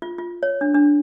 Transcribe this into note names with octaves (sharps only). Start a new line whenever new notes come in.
F4
F4
C#5
D4
D4